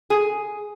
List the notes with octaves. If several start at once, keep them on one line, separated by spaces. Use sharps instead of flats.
G#4